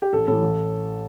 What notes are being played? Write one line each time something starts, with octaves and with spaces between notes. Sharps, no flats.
G4
A1 A4
A2 E3 A4
A1